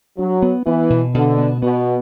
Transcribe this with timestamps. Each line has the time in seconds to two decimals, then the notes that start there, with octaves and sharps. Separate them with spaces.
0.18 F#3 D4
0.42 B3
0.66 E3 B3
0.90 B2
1.14 B2 D3
1.38 B3
1.62 B2 B3